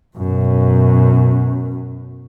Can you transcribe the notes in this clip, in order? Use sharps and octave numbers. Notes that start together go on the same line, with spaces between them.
F#2 B2